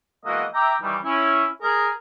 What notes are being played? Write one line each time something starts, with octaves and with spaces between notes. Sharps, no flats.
E3 G#3 A#3 B3 F#4 D#5
E5 G5 A#5 D6
D#3 E3 G3
C#4 E4
G#4 A#4